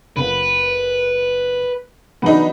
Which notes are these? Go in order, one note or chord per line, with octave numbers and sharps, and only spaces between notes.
F#1 B3 F4 B4
E3 F#3 B3 D4 D#4